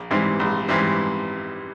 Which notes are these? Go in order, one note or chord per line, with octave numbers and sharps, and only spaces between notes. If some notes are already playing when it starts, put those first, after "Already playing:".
Already playing: A#1
G#2 E3 G3 C4
A#1
G#2 E3 G3 C4